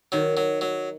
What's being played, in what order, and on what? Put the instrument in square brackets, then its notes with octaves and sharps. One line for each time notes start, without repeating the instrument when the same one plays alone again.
[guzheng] D#3 [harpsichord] F#3
[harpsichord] F#3
F#3